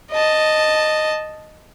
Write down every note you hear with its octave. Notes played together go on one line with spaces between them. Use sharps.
D#5 A5